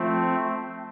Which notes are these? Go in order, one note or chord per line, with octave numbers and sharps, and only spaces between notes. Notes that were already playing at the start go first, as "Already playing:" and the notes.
Already playing: F3 A3 C4